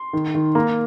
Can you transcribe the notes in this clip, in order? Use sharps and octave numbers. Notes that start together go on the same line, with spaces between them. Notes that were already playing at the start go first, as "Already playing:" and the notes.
Already playing: C6
D#3
D#3
A#3 A#5